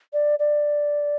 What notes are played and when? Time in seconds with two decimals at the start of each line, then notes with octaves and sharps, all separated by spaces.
0.13 D5
0.39 D5